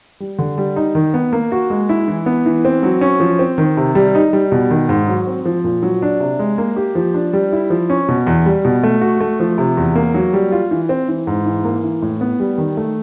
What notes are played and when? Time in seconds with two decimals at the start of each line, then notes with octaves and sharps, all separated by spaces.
0.20 G3
0.39 D3
0.58 G3
0.76 D#4
0.95 D#3
1.14 B3
1.33 A#3
1.52 F#4
1.70 G#3
1.89 E4
2.08 E3
2.26 B3
2.46 E3
2.65 C4
2.83 F#3
3.01 C#4
3.20 F3
3.39 C4
3.58 D#3
3.77 C3
3.95 G3
4.15 D#4
4.33 G3
4.52 B2
4.71 D#3
4.89 G#2
5.08 F#3
5.27 C4
5.45 F3
5.64 A#2
5.83 F#3
6.02 D4
6.20 C3
6.39 G#3
6.58 A#3
6.76 G4
6.95 F3
7.14 D4
7.33 G3
7.52 E4
7.70 F3
7.90 C#4
8.08 B2
8.27 E2
8.46 G3
8.65 B2
8.83 A3
9.01 F#4
9.21 A3
9.40 F3
9.58 C3
9.77 E2
9.95 A#3
10.14 F#3
10.33 G3
10.52 F4
10.71 E3
10.89 C4
11.08 E3
11.27 G#2
11.46 E3
11.65 A#3
11.84 E3
12.02 A2
12.21 B3
12.40 G3
12.58 D#3
12.77 A3